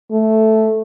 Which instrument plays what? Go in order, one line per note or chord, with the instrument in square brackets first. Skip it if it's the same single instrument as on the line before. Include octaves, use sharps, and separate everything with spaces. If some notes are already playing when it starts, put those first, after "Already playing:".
[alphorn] A3